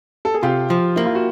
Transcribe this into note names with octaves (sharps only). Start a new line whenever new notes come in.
A4
G#4
C3 F4 G4
F3
A#3 E4
F4
F#4